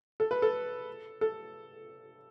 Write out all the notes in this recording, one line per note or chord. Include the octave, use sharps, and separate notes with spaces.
A4
B4
A4
A4